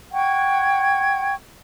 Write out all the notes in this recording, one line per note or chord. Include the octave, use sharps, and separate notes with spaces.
F#5 G5 C#6 G#6